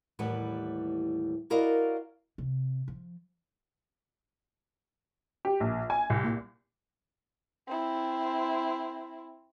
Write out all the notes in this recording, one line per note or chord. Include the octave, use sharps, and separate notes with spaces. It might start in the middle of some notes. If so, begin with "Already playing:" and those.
D#2 A2 E3 G3 B4 F#5
E4 F#4 A#4 D5 D#5 F5
C3
F3
G4
A#1
G#5
C2
A#2
C4 E4